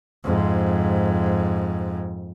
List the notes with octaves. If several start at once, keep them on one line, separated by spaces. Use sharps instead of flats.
F2 G#2